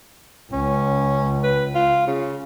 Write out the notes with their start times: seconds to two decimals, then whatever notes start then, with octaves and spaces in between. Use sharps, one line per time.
0.53 C#2 C#4
1.43 B4
1.75 F4
2.07 C#3